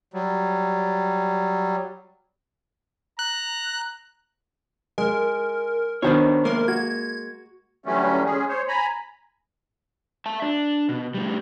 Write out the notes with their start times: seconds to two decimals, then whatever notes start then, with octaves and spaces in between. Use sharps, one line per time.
0.14 F#3 G3
3.19 A#5 F#6
4.98 G#3 A#4
6.02 B2 D#3 D4 C5 C#5
6.45 G#3 A#3 A#4
6.68 F#4 G#6
7.86 D3 E3 F#3 G3 A3 C#4
8.25 G#3 C#4 G#4
8.48 C5 C#5
8.68 G#5 A#5 B5
10.26 E5 A5
10.42 D4
10.89 B2
11.14 A2 G3